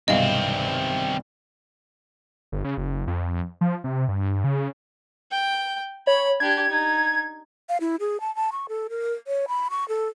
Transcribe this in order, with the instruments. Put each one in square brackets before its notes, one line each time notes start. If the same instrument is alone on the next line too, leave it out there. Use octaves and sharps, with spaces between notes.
[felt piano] B1 G2 C3 [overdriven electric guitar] D#3 C4 [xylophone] D#5 F5
[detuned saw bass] G1
C#3
F#1
F2
F3
C3
G2
C#3
[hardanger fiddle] G5
[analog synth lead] C#5 [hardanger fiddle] B5
[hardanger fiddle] D4 G4 [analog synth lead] G#6
[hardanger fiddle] D#4
[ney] F5
E4
G#4
A5
A5
C#6
A4
A#4
C#5
B5
C#6
A4